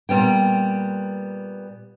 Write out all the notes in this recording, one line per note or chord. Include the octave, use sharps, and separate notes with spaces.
A#2 G3 B3 G5